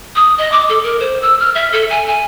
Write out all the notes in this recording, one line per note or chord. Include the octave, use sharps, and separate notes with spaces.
D#6
D#5
D6
A4
A#4
C5
E6
F6
E5
A4
G#5
G#5